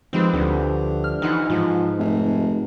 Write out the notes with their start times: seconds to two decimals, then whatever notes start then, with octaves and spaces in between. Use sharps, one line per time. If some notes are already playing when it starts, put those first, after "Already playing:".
0.13 G#2 F3 C4 G4 B4
0.33 D2 D3
1.04 F6
1.22 E3 D#4 F#5 C6
1.50 G#2 F3
1.99 F1